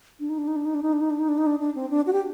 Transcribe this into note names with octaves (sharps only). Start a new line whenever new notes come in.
D4
D#4
D4
D#4
D4
D#4
D4
D#4
D4
D#4
D4
D#4
D4
D#4
D4
D4
C4
D4
F#4
G4